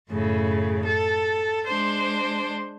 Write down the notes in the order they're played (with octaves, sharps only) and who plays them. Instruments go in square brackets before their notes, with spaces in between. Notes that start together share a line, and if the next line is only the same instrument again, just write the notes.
[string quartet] F#2 A2 C#3
A4
G#3 D4 C5